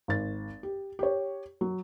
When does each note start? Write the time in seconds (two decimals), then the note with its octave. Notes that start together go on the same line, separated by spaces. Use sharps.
0.08 G#1 A6
0.63 G4
0.99 G4 C#5
1.61 F#3